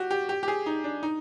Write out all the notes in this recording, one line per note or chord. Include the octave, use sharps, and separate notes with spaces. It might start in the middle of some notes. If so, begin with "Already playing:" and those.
Already playing: F#4 G4
G4
G4
G4
G#4
D#4
D4
D#4